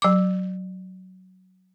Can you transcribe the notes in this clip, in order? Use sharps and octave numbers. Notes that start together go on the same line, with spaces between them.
F#3 D6